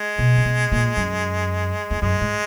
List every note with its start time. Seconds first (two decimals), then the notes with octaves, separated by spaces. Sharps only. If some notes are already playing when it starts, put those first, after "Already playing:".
Already playing: G#3
0.18 B2
0.37 C#3
0.45 B2
0.72 A#2
0.97 F#2
1.90 E2
2.01 F#2 G#3
2.21 G#2